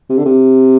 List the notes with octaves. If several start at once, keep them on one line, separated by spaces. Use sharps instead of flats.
C3
D3
C3